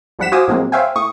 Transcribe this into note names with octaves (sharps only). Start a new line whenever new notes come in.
G#1 F3 G3 F#5 B6 E7
F#4 C5 F5 G#5 D6 D#6
A2 F3 F#3 G#3 A#3 C4
C5 C#5 E5 F5 G5 G#5
A2 C#6 D#6